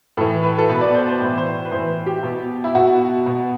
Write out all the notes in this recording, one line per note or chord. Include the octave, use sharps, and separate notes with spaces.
A2 E3 A4
B4
A4
B2 B4
D5
C5
C5
A2 E3 C5
C5
B4
A2 E3 C5
G4
B2
E4
B2 F#4
B2